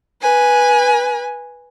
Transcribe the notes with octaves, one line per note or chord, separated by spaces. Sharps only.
B4 G#5